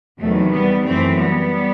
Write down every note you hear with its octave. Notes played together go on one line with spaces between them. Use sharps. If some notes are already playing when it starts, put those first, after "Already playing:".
E2 C3 D#3 F#3 A3
G3 B3
F#2 E3 A3 C4
G3 B3